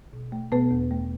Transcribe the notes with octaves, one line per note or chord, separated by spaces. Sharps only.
B2
A3
B2 B3 B4
E2
A3